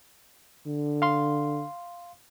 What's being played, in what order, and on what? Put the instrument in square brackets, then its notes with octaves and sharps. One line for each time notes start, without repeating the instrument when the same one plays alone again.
[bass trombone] D3
[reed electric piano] F5 C6